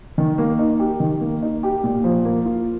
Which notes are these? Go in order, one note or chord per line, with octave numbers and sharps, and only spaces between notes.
D#3
A#3
D#4
G4
D#3
A#3
D#4
G4
A#2
F3
A#3
F4